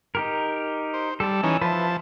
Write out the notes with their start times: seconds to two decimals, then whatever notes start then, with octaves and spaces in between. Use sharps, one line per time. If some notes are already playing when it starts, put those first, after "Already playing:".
0.15 D#4 G4 A#4
0.94 C5
1.20 G3 A4 A5
1.43 E3 C#4 D#4
1.61 F3 B4 E5 A5